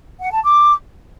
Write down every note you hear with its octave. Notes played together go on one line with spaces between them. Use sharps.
F#5
A5
D6